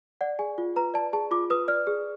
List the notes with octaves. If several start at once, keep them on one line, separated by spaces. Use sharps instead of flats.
D5 F#5
G#4 G#5
F4
B4 A#5
D5 A5
G#4 A5
F4 D6
B4 D#6
D5 F6
G#4